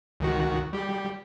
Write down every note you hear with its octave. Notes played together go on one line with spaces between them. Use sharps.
C#2 D#3 F#4
G3 G4